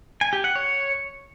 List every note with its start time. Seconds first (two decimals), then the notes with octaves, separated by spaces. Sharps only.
0.21 G#5
0.33 G4
0.44 F#5
0.55 C#5